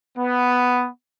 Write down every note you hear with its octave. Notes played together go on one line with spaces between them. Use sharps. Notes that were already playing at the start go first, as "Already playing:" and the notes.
B3